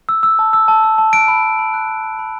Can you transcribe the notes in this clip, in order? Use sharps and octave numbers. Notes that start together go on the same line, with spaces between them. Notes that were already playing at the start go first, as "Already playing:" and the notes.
E6
E6
A5
E6
A5
E6
A5
F#6 D7
B5
B5
B5
F#6
B5
B5
B5